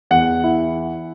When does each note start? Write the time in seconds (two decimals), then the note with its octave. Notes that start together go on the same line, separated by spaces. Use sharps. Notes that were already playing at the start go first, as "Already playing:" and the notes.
0.11 E2 F#5
0.44 E4